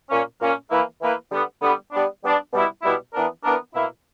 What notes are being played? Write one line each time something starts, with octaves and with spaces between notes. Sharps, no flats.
A#2 A#3 C#4
A#2 A#3 C#4
E3 A#3 E4 B4
E3 A#3 E4 B4
D3 G3 B3
D3 G3 B3
G3 B3 D4
G3 B3 D4
B2 G3 B3 E4
B2 G3 B3 E4
E3 B3 D4 A#4
E3 B3 D4 A#4
B2 A#3 E4